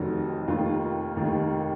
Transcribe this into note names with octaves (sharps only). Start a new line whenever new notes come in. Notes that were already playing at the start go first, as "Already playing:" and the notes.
Already playing: F1 F2 D#3 F#3 D#4
F1 D#2 D#3 F4
F1 D#2 D#3